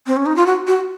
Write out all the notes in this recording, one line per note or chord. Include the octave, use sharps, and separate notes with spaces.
C4
C#4
D#4
F4
F#4
F#4